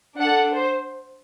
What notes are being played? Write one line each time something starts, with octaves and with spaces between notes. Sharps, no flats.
D4 A4 F#5
C5